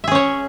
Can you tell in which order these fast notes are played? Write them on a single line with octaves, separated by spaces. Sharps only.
E5 G#4 C#4 C#5